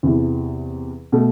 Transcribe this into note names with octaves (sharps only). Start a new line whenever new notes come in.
E2 C3 E3
B2 A3